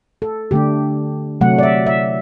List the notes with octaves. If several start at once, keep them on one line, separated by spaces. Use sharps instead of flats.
A4
D3 A3 D4 G4
C3 F#3 A3 F#5
D5
E5
E5